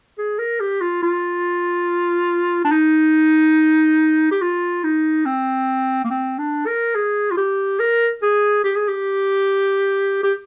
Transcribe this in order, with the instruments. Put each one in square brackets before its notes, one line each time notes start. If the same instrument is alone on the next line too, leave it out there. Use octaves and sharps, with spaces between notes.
[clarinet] G#4
A#4
G4
F4
F4
D4
D#4
G4
F4
D#4
C4
A#3
C4
D4
A#4
G#4
F4
G4
A#4
G#4
G4
G#4
G4
G4